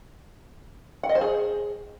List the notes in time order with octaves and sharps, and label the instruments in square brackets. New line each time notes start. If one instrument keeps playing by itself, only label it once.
[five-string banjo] F#5
D#5
C5
G#4